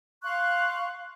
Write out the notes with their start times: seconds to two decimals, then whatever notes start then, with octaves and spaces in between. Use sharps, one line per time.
0.23 F5 C6 C#6 F#6